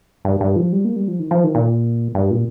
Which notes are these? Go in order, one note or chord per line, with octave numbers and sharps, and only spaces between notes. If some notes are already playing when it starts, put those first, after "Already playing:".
G2
G2
F3
G3
A#3
G3
F3
D#3
F3
D#3
A#2
G2
A#2